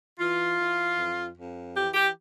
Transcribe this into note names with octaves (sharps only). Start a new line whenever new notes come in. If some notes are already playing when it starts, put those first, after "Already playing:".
E3 F4
E3
F2
F2
E3 G4
G4